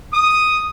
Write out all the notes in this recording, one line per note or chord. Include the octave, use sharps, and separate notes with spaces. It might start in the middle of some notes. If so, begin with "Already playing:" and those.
D#6